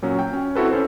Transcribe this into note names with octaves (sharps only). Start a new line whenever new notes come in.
A#2 F#3 C#4
G5
C#4
C4 E4 F#4 A4 B4
C#4 A4 C5